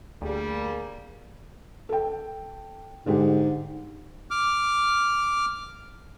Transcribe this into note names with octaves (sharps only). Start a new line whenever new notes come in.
D2 G3 A#3 G#4
A4 G5
G#2 D3 G#3 G4
D6 F6